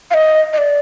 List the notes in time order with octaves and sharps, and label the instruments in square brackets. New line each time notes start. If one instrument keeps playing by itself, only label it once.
[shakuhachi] F5
D#5
D#5
D5